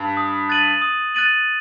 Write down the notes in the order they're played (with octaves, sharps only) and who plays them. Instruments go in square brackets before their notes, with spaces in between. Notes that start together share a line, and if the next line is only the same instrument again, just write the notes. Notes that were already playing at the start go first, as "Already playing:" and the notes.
Already playing: [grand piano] G2
[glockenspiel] D#6
F#6 A6 D#7 F#7
D#6
F#6 A6 D#7 F#7